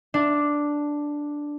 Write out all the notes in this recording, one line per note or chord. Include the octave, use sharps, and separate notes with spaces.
D4